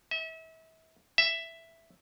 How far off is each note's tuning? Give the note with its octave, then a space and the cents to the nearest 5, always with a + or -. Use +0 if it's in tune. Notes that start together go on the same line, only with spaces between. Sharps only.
E5 -35
E5 +5